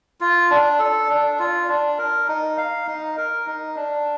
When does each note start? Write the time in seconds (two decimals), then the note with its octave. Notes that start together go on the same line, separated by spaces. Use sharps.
0.21 F4
0.50 D4
0.79 A4
1.09 D4
1.39 F4
1.68 D4
1.98 A#4
2.28 D#4
2.58 F5
2.87 D#4
3.17 A#4
3.46 D#4
3.76 D4